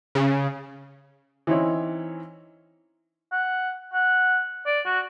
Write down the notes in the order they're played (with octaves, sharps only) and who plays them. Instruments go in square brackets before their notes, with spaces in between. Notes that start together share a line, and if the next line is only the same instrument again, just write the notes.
[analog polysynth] C#3
[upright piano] E3 C4 C#4 D#4 E4 C#5
[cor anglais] F#5
F#5
D5
F#4